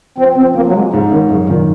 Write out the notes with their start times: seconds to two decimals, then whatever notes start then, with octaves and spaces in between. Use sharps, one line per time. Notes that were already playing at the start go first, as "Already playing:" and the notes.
0.17 F3 C4
0.36 F3 C4
0.55 F3 A#3
0.67 F#3
0.74 F3 G#3
0.93 G#2 C#3
1.11 D#3 C#4
1.31 F#2 C#3
1.49 A#2 D#3